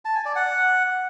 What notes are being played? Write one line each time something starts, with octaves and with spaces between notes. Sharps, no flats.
A5
G#5
D5
F#5